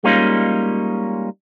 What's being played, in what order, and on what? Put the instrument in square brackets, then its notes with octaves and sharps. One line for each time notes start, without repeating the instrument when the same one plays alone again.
[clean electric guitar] G3 G#3 A#3 C#4 D#4 F4